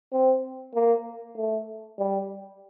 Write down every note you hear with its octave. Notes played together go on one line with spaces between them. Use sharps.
C4
A#3
A3
G3